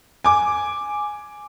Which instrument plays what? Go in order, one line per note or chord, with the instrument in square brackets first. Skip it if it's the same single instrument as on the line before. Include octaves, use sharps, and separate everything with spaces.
[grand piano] G#5 D6